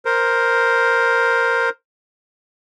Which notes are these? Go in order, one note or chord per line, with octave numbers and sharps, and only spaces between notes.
A#4 C5